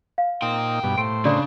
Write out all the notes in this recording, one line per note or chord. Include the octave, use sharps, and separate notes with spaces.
F5
A#2 D#4 G5 C6
G2 B2
A2 C5 D7
C#3 D4 D5